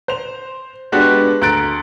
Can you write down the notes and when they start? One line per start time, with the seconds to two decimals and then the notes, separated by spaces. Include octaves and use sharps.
0.08 C5 F7
0.92 G#3 B3 D4 F#4 G4 B4
1.42 D2 A#5 F#6 A6 D7